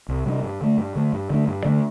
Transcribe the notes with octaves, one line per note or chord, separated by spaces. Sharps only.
C2
C3 G3 D4
G2
D3 A3
G2
D3 A3
G2
D3 A3 D4
G2
D3 A3 D4